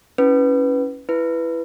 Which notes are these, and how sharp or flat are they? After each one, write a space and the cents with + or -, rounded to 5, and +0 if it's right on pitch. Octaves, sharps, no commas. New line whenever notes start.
C#4 +0 E4 -20 B4 +0
E4 +15 B4 +0